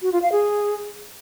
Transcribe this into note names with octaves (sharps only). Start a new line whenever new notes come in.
F#4
F4
F5
G#4